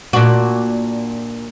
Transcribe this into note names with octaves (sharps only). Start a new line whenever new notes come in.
A#2 D4 F#4